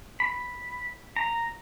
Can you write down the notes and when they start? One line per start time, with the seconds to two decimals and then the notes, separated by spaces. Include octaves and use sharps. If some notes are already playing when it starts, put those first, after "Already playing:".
0.20 B5
1.16 A#5